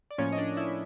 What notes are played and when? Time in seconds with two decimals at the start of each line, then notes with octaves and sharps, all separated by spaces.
0.11 D5
0.18 A2 F3 A#3 C#4 C#5
0.32 D#5
0.38 D4 D5
0.57 E4 E5